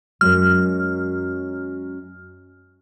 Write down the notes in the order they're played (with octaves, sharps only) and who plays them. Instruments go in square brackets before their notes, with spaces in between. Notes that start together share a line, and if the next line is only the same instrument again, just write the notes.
[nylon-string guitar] F#2 F#3 G#3 [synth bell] F6